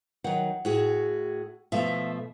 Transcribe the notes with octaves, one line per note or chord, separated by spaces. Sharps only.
D#3 F#3 F#5
A2 F#4 G#4
B2 F3 A3 E5 F5